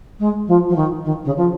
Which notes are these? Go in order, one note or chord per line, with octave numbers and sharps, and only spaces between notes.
G#3
F3
F3
D#3
D#3
C#3
F3